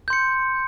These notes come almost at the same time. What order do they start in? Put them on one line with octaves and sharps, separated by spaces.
G6 C6 C#7